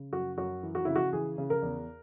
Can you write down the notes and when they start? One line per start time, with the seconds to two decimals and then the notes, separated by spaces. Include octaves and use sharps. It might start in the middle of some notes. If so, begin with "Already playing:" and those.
Already playing: C#3
0.13 F#2 F#4
0.38 F#2 F#4
0.63 E3
0.75 F#4
0.85 C#3 E4
0.96 F#4
1.13 E3 G#4
1.38 C#3
1.50 A#4
1.62 E2